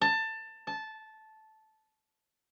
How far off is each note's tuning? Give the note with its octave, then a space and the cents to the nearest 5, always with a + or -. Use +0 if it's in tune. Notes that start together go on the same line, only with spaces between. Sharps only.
A5 +20
A5 -10